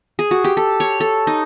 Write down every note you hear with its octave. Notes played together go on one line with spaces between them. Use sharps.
G#4
F#4
G4
A4
C#5
A4
D#4